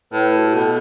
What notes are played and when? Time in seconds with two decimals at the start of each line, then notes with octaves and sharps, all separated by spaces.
0.12 A2 B4
0.38 F#4
0.46 G4
0.55 B2 A4